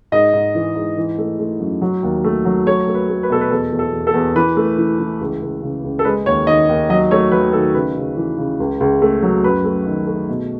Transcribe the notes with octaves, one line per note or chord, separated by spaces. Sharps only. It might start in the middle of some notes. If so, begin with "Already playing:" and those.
G#2 D#5
G#2
E3
G#2
E3
A3
A3
F#2
F#3
D#2
A3
F#3
A3 C#5
A3
B4
A3
B4
B2 A4
B4
E2 A4
E2
A4
E2
A4
E2
E3 B4
A3
E3
E3
C#2
C#2
C#3
C#2
A4
G#3 B4
D#2 C#5
D#3 D#5
D#2
F#3 D#5
A3 C#5
F#3 B4
D#3 A4
C#3 B4
C#3
E3
C#3
C#2
C#2
A3
F#3
F#2 B4
A3
D#3
A3
B2